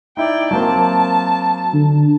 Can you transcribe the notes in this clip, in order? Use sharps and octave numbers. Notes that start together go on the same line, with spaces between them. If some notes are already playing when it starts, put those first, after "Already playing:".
D#4 E4 D5 G5
F#3 A#3 C4 A5
D3